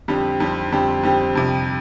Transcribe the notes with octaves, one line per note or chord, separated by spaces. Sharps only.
F2 D3 G3 C4 G4
F2 D3 G3 C4 G4
F2 D3 G3 C4 G4
F2 D3 G3 C4 G4
F2 C3 G3